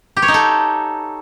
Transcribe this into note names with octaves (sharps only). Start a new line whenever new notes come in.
G4
C#5
D#4
A4